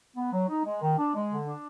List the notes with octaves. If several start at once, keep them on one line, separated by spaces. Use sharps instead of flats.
B3
F#3
D#4
G#3
D#3
D4
G#3
D3
D4